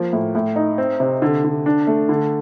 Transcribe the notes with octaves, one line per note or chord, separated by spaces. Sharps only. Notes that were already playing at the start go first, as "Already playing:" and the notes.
Already playing: F3 A#3
A2
A2
D#4
C4
C3
D3
D3
D4
A3
D3